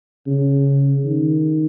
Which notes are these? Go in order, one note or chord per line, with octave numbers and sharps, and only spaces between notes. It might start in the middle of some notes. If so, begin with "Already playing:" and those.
C#3
D#3